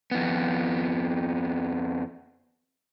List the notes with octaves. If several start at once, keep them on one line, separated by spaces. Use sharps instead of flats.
F2 B3